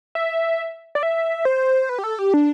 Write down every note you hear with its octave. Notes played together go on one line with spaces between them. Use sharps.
E5
D5
E5
C5
B4
G4
A4
G4
D4